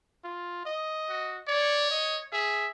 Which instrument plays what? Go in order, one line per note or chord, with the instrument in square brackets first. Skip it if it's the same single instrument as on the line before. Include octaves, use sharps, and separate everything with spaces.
[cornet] F4
D#5
[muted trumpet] F#4
[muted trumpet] C#5 [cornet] D5
[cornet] D#5
[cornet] G#4 [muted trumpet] E5